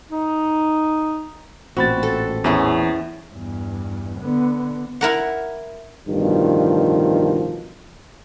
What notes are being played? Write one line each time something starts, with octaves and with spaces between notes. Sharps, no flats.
D#4
A1 A#2 C4 F#4 B5 A6
A4
E2 C#4 E4 G#4
E2 G2
D3 B3
E4 A#4 F#5
A1 G2 B2 D#3 F3